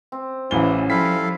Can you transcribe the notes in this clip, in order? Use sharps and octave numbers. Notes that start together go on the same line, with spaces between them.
C4
A1 C#3 E3 F#3 G#4 G7
F3 G3 E4 A4 F5 B6